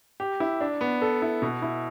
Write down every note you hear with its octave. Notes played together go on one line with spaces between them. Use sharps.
G4
E4
D4
B3
A4
E4
B2
E4